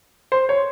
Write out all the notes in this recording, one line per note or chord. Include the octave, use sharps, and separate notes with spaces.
C5
C#5